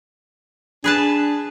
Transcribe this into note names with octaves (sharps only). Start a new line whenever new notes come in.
D4 G#4 B4 A5